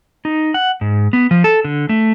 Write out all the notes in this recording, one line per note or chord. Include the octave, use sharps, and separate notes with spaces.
D#4
F#5
G#2
B3
F3
A4
D3
A3